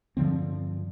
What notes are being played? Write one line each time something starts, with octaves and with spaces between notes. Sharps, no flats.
G2 D3 F3 C4